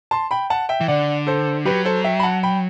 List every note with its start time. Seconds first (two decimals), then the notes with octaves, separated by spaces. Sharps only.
0.11 A5 C6
0.31 G5 B5
0.50 F#5 A5
0.69 E5 G5
0.81 E3
0.88 D3 D5 F#5
1.27 A4 C5
1.65 F#3 G4 B4
1.85 A4 C5
2.04 E5 G5
2.20 B5
2.23 F#5 A5
2.43 G5 B5